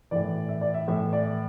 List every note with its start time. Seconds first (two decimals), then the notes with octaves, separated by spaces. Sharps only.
0.11 A2 E3 D5
0.49 E5
0.61 D5
0.74 E5
0.88 A2 E3 E5
1.13 D5